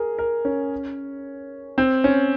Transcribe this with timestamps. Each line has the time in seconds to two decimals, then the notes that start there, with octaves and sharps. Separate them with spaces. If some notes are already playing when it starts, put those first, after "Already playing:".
Already playing: G#4 A#4
0.19 A#4
0.45 C#4
1.78 C4
2.04 C#4